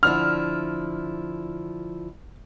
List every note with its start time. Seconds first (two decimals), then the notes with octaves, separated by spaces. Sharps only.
0.03 D3 F3 E4 F6